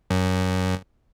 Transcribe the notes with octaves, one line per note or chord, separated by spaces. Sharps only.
F#2